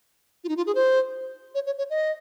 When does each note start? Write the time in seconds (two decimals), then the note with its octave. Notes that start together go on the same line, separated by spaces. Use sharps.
0.44 F4
0.49 D#4
0.57 F4
0.67 G#4
0.75 C5
1.55 C#5
1.66 C#5
1.78 C#5
1.90 D#5